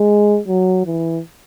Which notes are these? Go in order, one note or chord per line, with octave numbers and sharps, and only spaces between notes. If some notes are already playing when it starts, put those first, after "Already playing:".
Already playing: G#3
F#3
E3